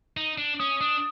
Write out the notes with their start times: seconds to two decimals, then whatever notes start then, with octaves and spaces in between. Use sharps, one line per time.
0.17 D#4 F#7
0.38 D4 F#7
0.60 C#4 D#6
0.81 D4 D#6